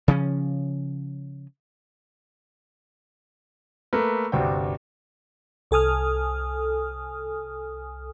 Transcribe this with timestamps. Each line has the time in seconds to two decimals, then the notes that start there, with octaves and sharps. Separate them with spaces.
0.08 C#3 F3 C#4
3.93 A3 A#3 A#4 B4
4.32 G1 D2 C3 D4 F#4 G5
5.71 C2 A4 G#5 D#6 F6